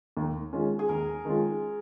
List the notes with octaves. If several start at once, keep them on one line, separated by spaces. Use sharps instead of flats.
D#2
D#3 G#3 C#4 F4
G#4
D#2 A#4
D#3 G#3 C#4 F4